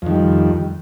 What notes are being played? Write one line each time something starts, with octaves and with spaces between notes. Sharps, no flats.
F2 D#3 G3